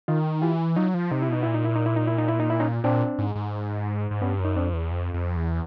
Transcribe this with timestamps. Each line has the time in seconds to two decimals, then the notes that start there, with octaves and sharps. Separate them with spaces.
0.08 D#3 D#4 F4
0.42 E3 F4 G4
0.76 F#3 D#4 F4
0.94 F3
1.11 C3 D#4
1.22 E4
1.28 B2 D#4
1.43 A#2 E4
1.54 D#4
1.65 E4
1.75 D#4
1.86 E4
1.96 D#4
2.07 E4
2.18 D#4
2.28 E4
2.40 D#4
2.50 E4
2.60 C#4 D#4
2.84 A#2 C4 D4
3.19 G#2
3.35 G#2
4.11 G#2
4.22 G2 B3 C#4
4.39 F#2
4.45 D#4
4.56 F2 C4 D4
4.73 E2
4.91 F2
5.14 F2
5.36 E2